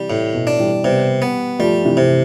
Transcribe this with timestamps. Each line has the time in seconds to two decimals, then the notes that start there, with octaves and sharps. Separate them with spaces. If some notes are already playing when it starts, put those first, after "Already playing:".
Already playing: C3 E3 G3
0.10 A2
0.34 B2
0.47 D4
0.59 E3 G3
0.84 C3 G3 B3
1.22 B3
1.59 F3 G3 A3
1.85 C3 E3
1.97 C3